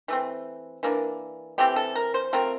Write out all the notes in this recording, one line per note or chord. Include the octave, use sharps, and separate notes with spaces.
E3 A3 C4
E3 A#3 D4
E3 A3 C4 G4
A4
A#4
C5
F3 A3 C4 A#4